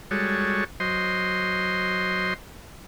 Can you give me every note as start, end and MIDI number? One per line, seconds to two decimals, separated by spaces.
0.11 0.64 55
0.11 0.64 56
0.11 0.64 66
0.11 0.64 69
0.11 0.64 73
0.80 2.34 54
0.80 2.34 72
0.80 2.34 75
0.80 2.34 84